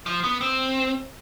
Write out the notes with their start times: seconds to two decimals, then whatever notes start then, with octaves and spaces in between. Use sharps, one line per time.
0.06 F3
0.24 B3
0.41 C4